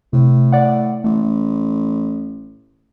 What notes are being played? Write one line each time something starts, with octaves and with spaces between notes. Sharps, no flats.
A2 C3
D5 F#5
A1 A3